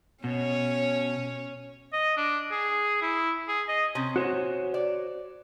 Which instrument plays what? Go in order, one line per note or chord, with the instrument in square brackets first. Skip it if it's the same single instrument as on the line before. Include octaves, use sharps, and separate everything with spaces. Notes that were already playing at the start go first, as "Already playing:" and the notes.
[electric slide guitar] B2 [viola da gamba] C#4 C#5
[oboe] D#5
D4
G#4
E4
G#4
D#5
[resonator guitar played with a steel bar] C3 C#4
[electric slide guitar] F#4 C5 C#5
[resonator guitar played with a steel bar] D5